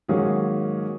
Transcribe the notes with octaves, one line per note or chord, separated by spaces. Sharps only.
G#2 D#3 F#3 A#3 C#4 G#4